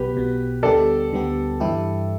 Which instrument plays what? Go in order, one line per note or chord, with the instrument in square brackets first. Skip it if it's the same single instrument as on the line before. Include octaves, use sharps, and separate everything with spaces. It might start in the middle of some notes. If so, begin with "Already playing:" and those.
Already playing: [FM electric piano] B1 B2 B3 [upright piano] G4 B4
[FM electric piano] B1 B2 B3
[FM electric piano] D2 D3 G3 B3 G4 [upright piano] A4 D5
[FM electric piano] D2 D3 G3 B3 G4
G2 E3 G3 E4 G4